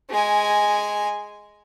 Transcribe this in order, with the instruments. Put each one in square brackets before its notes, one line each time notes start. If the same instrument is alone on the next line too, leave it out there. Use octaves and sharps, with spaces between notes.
[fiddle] G#3 G#5